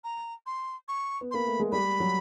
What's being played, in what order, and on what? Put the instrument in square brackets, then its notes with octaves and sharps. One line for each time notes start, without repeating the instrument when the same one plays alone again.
[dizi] A#5
C6
C#6
[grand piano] B3
[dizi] C6
[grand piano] A#3 [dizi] B5
[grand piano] A3
G#3
[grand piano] G3 [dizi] B5
[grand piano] F#3